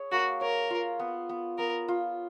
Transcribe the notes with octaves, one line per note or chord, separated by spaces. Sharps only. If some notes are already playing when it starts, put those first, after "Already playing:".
Already playing: G#4 C#5
A#3 F#4
A#4 C#5
F4
B3
B3
B3 A#4
F4